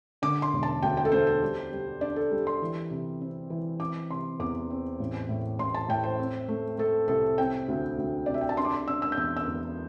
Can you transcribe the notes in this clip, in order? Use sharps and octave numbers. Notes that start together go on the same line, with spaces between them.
D3 D6
C6
E1
A5
D2 G5
G5
A4
D2 C5
C5
G3
G3
D4 D5
A4
G3
C6
E3
C3
C4
E3
C4 D6
C3 C6
E2 D6
C4
A1
A2
A1 C6
A5
A2 G5
C5
C4
A3
A3 A4
C2 A4
C4 G5
D2
D2
C3 D5
E5
G5
A5
D4 C6
D6
C6
D4 E6
E6
G6
E2 E6
E6
E2